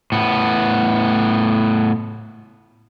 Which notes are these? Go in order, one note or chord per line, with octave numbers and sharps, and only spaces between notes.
A2 B3